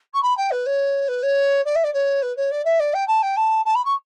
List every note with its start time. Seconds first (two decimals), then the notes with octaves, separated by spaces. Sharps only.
0.13 C#6
0.22 B5
0.37 G5
0.51 B4
0.66 C#5
1.08 B4
1.22 C#5
1.65 D5
1.75 E5
1.83 D5
1.93 C#5
2.22 B4
2.36 C#5
2.51 D5
2.64 E5
2.79 D5
2.93 G5
3.07 A5
3.22 G5
3.36 A5
3.65 A5
3.75 B5
3.85 C#6